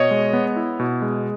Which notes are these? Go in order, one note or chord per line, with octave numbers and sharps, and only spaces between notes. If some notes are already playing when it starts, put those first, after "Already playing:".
Already playing: B2 C#5 D#5
G#3
B3
E4
B2
G#3